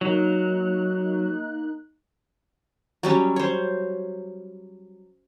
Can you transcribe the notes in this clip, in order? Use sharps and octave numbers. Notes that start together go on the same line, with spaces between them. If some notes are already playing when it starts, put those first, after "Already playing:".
F#3 A#3 D#4 F#6
F#3 G3 C#4
C5 C#5